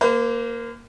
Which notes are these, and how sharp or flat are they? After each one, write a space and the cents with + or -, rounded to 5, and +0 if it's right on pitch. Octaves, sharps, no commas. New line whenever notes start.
A#3 +0 C5 -40